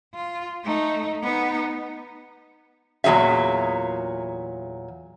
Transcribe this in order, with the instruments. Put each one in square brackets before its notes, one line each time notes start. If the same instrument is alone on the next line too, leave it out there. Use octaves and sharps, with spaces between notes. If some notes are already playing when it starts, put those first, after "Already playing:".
[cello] F4
A3 D#4
B3 D#4
[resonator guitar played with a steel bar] E2 A#2 F#3 G#4 E5